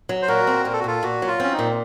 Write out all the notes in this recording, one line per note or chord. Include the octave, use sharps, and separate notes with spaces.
F#3
C5
A#2 F#4 A#4
C4
A#2 A#4
A4
F#4
A#2 F4 A4
A#2 F#4
F#3
F4
C4 C#4
D#4
A#2